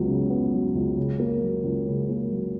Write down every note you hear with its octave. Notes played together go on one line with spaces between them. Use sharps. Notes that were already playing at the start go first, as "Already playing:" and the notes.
Already playing: C#2 F#3 B3
C#3
B3
F#3
C#2
C#3
A#3
F#3
C#2
C#3
A#3
F#3